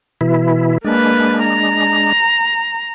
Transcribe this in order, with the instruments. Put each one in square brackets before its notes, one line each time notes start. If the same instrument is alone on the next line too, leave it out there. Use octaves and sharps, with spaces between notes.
[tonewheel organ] B2 E3 E4
[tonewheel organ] G#3 D4 [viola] A#3 B4
[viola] A#5